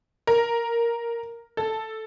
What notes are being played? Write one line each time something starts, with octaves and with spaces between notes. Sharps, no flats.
A#4
A4